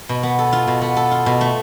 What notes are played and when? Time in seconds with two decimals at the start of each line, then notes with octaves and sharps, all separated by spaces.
0.09 B2
0.23 B3
0.39 A4
0.53 F4
0.67 B2
0.82 B3
0.97 A4
1.11 F4
1.26 B2
1.41 A3